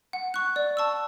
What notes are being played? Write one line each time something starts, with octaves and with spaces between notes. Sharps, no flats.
F#5
C#6 F#6
D5
A5 C#6 E6